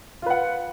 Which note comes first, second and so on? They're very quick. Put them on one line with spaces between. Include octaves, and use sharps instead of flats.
F4 B4 F#5